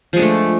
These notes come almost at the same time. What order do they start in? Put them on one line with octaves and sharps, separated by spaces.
F3 G#3 D4 A3